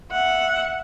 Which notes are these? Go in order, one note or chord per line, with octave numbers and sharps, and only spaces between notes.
E5 F#5